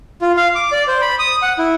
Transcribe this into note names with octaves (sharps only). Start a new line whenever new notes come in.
F4
F5
D6
D5
C5
B5
D#6
F#5
E4